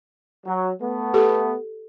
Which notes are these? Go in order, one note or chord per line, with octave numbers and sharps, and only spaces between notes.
F#3
A3 B3
G4 A4